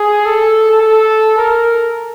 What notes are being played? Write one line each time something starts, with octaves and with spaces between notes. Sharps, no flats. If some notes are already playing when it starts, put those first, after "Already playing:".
Already playing: G#4
A4
A4
A#4